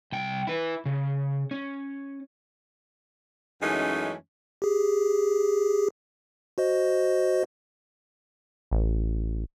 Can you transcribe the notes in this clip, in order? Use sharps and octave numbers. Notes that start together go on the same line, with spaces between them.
C2 G5
E4 B4
C#3
C#4
F#2 E3 G#3 A3 C#4 D#4
G4 G#4
F#4 C5 D#5
A1